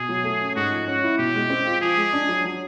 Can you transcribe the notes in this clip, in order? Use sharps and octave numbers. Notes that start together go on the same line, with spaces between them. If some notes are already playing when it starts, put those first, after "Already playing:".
Already playing: B2 G#4
F#3
A3
C#4
G#2 F#4
F3
C#4 F#4
E4
B2 G4
G#3
C4
F4
F3 G#4
G#3
D4
F#3
F#3